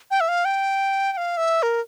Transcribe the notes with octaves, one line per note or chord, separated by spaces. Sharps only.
G5
E5
F5
G5
G5
F5
E5
A#4